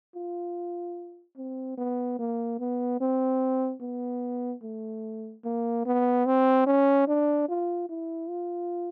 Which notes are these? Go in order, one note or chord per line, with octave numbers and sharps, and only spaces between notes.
F4
C4
B3
A#3
B3
C4
B3
A3
A#3
B3
C4
C#4
D4
F4
E4
F4